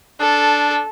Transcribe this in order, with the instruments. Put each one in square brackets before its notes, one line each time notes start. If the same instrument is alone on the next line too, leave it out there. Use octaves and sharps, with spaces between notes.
[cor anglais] D4 [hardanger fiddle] A4